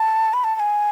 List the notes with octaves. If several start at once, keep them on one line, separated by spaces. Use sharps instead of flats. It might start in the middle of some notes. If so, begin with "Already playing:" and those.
Already playing: A5
B5
A5
A5
G#5